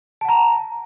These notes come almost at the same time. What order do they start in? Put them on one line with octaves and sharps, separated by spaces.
A5 F#5 A#5